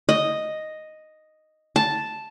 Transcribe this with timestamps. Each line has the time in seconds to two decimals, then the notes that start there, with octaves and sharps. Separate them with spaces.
0.09 D#5
1.76 A5